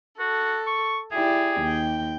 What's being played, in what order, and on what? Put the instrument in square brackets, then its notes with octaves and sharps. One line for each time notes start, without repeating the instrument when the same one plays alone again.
[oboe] F#4 [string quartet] A4
[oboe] C#6
[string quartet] E4 G4 D5 [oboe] G#4
[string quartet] D#2 G5